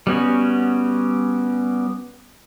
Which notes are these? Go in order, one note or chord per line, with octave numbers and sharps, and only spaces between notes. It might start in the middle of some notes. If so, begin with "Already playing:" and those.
G3 B3 C#4 F#4